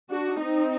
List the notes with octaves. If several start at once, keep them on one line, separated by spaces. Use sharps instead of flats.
D4 F#4
C4 D#4